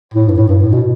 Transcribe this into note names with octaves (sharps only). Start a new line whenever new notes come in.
A2
G2
A2
G2
A2
B2